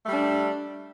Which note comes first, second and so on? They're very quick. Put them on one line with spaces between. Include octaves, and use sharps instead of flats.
A3 G3 D4